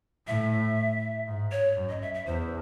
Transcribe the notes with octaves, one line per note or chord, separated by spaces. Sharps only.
A2 E5
G#2
C#5
F#2
D#5
E5
E5
E2 C5